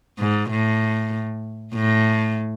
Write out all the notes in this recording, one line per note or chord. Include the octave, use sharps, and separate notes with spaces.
G#2
A2
A2